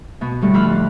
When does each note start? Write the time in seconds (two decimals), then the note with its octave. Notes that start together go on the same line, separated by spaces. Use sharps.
0.21 B2 B3
0.42 A2 D3 G3
0.54 F2 D4 B5 F6 F#6
0.72 D4